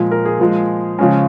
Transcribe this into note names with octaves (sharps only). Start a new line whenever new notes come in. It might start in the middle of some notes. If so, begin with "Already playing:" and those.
Already playing: A#2 F3 G#3
A#4
G#4
A#2 F3 G#3
C#3 F3 G#3 C#4